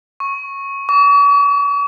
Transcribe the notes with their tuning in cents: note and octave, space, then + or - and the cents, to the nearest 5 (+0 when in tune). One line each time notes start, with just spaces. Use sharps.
C#6 -10
C#6 +45